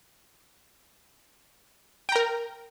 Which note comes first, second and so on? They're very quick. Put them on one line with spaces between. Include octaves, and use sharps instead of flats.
G5 A#5 A#4